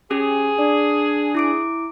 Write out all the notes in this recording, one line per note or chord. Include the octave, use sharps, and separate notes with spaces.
C#4 G4 G#4
D4 D5
E4 D6 D7